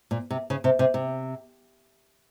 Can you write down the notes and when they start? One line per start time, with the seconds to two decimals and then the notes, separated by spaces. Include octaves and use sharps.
0.11 A#2
0.30 C3
0.50 C#3
0.64 C3
0.79 C3
0.94 C3